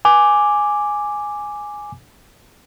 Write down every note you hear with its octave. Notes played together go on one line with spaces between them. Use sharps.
G#5 D6